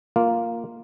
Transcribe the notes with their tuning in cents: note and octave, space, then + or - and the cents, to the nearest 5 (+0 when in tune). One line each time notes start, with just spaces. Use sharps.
A#3 +0 F4 +0